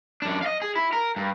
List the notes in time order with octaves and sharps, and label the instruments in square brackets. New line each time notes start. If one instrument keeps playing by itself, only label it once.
[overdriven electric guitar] F#2 D4
D#5 F5
G#4
E4
A#4
G2